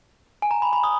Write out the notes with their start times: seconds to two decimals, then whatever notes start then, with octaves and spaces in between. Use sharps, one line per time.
0.42 G#5
0.51 A#5
0.62 B5
0.73 B5
0.84 D#6